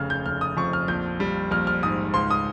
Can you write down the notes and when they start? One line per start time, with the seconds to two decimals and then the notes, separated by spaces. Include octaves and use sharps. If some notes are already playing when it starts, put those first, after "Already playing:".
Already playing: F1 C#3 F6
0.10 G6
0.25 F1 F6
0.41 D#6
0.57 F2 C#6
0.73 F6
0.88 A#1 G6
1.20 G3
1.51 A#1 F6
1.67 F6
1.83 G#2 D#6
2.14 C#2 C6
2.30 D#6